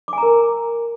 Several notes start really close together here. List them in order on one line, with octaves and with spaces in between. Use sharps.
D6 G#5 A#5 A#4